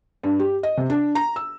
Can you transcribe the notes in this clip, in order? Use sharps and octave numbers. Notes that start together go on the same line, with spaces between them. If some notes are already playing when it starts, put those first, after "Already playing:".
G2
G4
D#5
C3
D4
A#5
E6